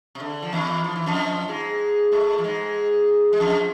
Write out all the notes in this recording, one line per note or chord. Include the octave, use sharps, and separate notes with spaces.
C3
D3
F3
E2 E3
F3
E3
F2 F3
G#2 G#3
A2 A3
F3
G#2 G#3
G#3
F2 F3